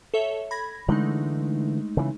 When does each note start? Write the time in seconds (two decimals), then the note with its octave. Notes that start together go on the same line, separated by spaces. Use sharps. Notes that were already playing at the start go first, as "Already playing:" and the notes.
0.14 A4 C#5 E5
0.51 B5 G#6 A#6
0.89 D3 E3 G#3 A3 D#4
1.97 C#3 E3